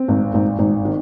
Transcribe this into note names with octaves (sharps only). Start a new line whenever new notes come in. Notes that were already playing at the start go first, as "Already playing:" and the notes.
Already playing: C4
G#1
G#1
G#1
D#3